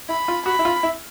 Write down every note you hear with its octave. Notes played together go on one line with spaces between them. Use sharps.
E4 B5
F4
F#4 B5
E4
F4
E4